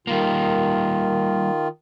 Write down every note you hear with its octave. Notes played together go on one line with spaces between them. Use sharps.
D#3 G3 A#3 F4